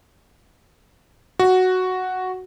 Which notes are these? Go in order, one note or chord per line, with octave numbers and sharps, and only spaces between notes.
F#4